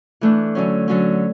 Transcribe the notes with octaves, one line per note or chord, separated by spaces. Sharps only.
E3 A3 D4
D3 F#3 C#4
D3 F#3 C#4